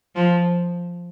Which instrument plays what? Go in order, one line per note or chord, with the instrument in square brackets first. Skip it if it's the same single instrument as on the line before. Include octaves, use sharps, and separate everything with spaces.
[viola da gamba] F3